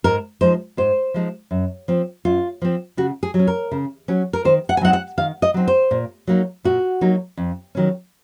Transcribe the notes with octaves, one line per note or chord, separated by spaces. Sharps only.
G#2 A#4
F3 G#3 D#4 C5
G#2 C5
F3 G#3 D#4
F#2
F3 C4
F#2 F4
F3 C4
C#3 F#4
G#4
F#3
C#4
A#4
C#3
F#3 C#4
A#4
D#3 C5
F#5
G#5
F#3 C4 D#4 F#5
F#5
D#3 F5
D#5
F#3 C4 D#4
C5
A#2
F#3 A#3 D#4
A#2 F#4
F#3 A#3 D#4
F2
D#3 F#3 C#4